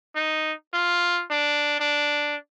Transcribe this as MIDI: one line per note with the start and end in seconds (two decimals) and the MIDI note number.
0.16 0.53 63
0.73 1.23 65
1.30 1.77 62
1.80 2.36 62